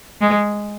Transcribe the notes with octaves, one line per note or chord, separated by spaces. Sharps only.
G#3